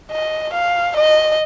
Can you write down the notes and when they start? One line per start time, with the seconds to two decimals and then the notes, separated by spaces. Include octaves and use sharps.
0.11 D#5
0.54 F5
0.97 D#5